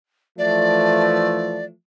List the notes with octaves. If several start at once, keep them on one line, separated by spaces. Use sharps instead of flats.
E3 F3 A3 D5